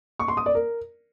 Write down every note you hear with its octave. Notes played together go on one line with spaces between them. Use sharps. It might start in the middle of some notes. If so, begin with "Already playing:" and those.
C#6
C6
D#6
D5
A#4